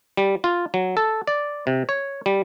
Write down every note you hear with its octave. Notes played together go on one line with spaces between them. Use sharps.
G3
F4
F#3
A4
D5
C3
C#5
G3